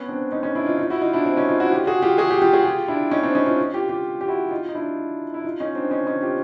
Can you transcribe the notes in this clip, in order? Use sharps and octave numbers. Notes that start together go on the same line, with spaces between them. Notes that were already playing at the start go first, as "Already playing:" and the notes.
Already playing: B3 C#4
C4 D4
C#4 D#4
C#4 D#4
D4 E4
D#4 F4
D#4 F4
E4 F#4
D#4 F4
D4 E4
C4 D4
C#4 D#4
D#4 F4
E4 F#4
F4 G4
F#4 G#4
F4 G4
F#4 G#4
F4 G4
F4 G4
F#4 G#4
F4 G4
D4 E4
C#4 D#4
C4 D4
C#4 D#4
D#4 F4
F4 G4
F4 G4
G4
E4 F#4
D#4 F4
D#4
D4 E4
E4
D#4 F4
C#4 D#4
C4 D4
C#4 D#4
C#4 D#4
F4 G4